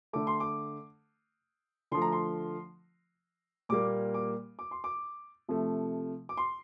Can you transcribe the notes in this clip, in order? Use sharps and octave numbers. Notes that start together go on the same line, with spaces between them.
D3 A3 D6
C6
D6
D3 F3 A3 C6
A#5
C6
A#2 G3 A#3 D6
D6
D6
C6
D6
C3 F3 A3
D6
C6